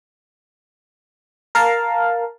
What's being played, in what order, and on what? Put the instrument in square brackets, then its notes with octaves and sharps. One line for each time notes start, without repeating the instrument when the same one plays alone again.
[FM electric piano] A#4 F5 A5